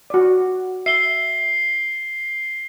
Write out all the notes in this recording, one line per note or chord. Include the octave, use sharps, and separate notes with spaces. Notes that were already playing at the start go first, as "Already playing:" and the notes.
F#4 D5
E5 C7 G7